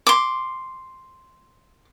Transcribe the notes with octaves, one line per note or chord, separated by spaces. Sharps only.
C6 D6